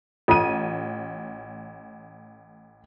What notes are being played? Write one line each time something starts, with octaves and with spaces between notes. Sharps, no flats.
A1 F4 A4 D#7